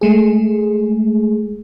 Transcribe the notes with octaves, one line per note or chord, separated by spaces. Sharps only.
G#3 A3 G#4